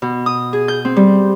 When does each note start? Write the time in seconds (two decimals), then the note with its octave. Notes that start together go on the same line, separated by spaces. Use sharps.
0.02 B2
0.26 D#6
0.53 G#4
0.68 G6
0.85 C4
0.96 G3